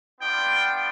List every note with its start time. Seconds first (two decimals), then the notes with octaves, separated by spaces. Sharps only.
0.20 B3 D4 F4 G5